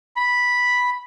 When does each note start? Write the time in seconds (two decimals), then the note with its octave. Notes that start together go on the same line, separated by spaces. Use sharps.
0.16 B5